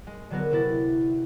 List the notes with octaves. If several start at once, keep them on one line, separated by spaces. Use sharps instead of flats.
G#3
D3 F#3 B3 F#4 A#4
C3 E4 A6